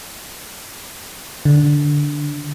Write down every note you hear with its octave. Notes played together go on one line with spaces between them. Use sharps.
D3